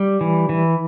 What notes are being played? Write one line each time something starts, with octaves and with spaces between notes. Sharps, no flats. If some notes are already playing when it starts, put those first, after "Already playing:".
Already playing: G3
E3
E3